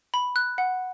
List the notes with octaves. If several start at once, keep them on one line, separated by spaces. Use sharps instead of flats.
B5
F#6
F#5